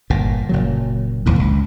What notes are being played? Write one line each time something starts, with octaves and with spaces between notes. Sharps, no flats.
G1 A#2
F#1 A#2 F#3
E1 D#2 A2
C#2